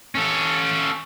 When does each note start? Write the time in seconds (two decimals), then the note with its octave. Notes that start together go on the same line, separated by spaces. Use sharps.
0.15 C#4 A4